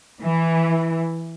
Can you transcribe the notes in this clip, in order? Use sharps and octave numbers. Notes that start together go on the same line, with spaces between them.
E3